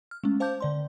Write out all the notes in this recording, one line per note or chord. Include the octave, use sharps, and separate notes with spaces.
F6
G#3 A3 C#4
C5 F5 A5 D6 G6
D3 D5 C6